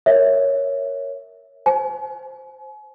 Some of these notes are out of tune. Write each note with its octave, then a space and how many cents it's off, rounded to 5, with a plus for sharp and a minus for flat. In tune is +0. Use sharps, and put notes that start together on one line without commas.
A#4 +0 C#5 +0 E5 -10
C5 +0 G#5 +40